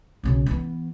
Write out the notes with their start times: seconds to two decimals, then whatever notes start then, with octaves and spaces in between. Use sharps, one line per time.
0.23 B1 C#3
0.46 E3 B3